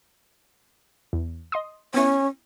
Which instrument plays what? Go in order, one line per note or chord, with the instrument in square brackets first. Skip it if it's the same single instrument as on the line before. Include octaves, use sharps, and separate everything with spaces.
[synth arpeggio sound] E2
D#5 C6 D#6
[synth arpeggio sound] B3 E4 [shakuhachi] C#4